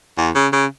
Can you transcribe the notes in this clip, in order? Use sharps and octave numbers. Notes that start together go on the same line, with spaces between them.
E2
C#3
C#3